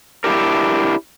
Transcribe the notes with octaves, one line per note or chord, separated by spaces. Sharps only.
D4 E4 G4 A#4